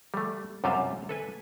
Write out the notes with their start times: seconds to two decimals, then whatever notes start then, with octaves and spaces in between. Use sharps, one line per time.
0.14 G3 A3
0.64 F#2 C3 G3 F4 C5 F5
1.09 A4 B4 G#5